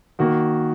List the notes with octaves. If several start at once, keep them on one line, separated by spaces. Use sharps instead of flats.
D#3 A#3 F#4